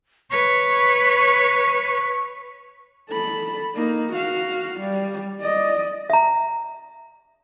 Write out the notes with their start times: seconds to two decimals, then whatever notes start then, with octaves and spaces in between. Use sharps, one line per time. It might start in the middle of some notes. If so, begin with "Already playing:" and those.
0.31 B4 C#5 C#6
3.10 A4 B5
3.75 A#3 D#4
4.13 F#4 F5
4.80 G3
5.40 D5 D#5
6.10 E5 A#5